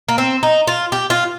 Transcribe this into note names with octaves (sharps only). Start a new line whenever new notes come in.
A#3
C4
D#4
F4
G4
F4